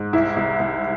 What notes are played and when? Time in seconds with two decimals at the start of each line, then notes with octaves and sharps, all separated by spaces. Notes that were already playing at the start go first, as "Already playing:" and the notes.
Already playing: G#2
0.13 C2 E4
0.36 C2
0.59 C2